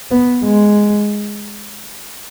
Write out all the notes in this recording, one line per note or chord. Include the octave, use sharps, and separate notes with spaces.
B3
G#3